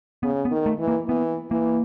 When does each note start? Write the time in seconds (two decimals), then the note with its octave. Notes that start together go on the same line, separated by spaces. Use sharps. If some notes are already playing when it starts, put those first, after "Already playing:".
0.23 C#3 B3
0.45 B3
0.51 D#3
0.66 A3
0.80 E3
0.88 A#3
1.08 E3 B3
1.51 E3 A#3